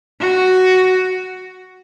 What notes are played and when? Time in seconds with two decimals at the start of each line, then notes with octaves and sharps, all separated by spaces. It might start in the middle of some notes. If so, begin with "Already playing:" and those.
0.21 F#4